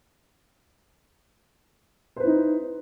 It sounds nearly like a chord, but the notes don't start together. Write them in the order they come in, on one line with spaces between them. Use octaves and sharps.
C5 B4 E4 D#4